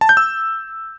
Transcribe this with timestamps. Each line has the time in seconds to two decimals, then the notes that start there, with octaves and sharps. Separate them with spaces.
0.01 A5
0.09 G6
0.17 E6